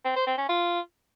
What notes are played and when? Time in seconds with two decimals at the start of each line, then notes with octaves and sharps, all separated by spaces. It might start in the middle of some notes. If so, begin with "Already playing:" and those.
0.04 C4
0.16 C5
0.27 C4
0.38 C#4
0.49 F4